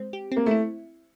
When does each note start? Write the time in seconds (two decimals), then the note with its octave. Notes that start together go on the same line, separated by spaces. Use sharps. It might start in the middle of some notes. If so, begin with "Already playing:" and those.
Already playing: G#3 C4
0.13 G4
0.32 A#3 C4
0.46 A3 E4